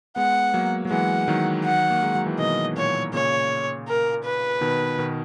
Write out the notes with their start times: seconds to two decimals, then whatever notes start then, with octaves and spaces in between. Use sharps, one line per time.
0.16 G#3 B3 F#5
0.54 F#3 A#3
0.85 F#3
0.91 E3 G#3 F#5
1.28 D#3 F#3
1.65 F#5
1.90 A#3
2.03 G#3
2.15 F#3
2.26 E3
2.39 B2 D#3 D#5
2.76 A#2 C#5
3.14 A#2 C#3 C#5
3.88 A#4
4.25 B4
4.61 B2 D#3
4.98 B2 D#3